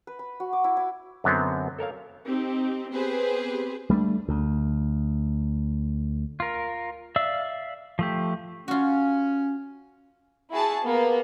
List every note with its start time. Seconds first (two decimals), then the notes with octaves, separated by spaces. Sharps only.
0.07 B4
0.19 B5
0.40 F#4
0.53 D6
0.64 E4
0.77 E4
1.24 F#2 D3 F#3 B3 C4
1.79 A4 A#4 C#5 F5
2.27 C4 D#4 G4
2.92 B3 C4 G4 G#4 B4 C5
3.90 G3 A3 B3 D4
4.29 D2
6.40 F4 A#4
7.16 D5 E5 F5 E6
7.99 F3 A3 G4
8.68 C#4 F4 F#4
10.51 E4 F#4 G#4 A5
10.84 A#3 B3